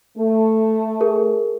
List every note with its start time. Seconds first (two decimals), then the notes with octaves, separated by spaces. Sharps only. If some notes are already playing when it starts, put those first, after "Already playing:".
0.18 A3
1.01 G#4 A#4